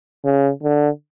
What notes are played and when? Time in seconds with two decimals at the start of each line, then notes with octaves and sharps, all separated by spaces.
0.25 C#3
0.63 D3